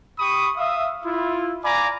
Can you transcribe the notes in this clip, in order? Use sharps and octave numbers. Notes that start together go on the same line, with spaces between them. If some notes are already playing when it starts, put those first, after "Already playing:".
G4 B5 C#6 D#6
E5 F5 D#6
E4 F4
D5 F5 G#5 A#5 B5 D6